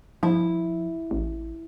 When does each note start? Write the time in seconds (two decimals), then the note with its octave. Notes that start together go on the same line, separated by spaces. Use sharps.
0.23 F3 E4
1.11 A1